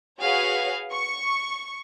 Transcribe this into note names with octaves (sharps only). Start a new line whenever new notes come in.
F#4 G#4 B4 C#5 F5
C#6